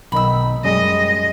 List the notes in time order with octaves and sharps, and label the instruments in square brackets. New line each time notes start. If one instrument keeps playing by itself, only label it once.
[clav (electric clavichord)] B1 D#3 D#4 [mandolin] B5 E6
[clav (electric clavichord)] F#2 G3 G#3 [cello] D#5